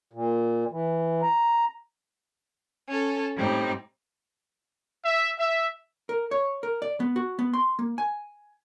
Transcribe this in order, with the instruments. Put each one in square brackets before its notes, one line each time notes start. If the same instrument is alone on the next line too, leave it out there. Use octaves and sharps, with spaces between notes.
[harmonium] A#2
E3
A#5
[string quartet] C#4 A4
A2 G3 C4 D#4
[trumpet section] E5
E5
[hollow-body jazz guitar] A#4
C#5
A#4
D5
B3
F#4
B3
C6
A#3
G#5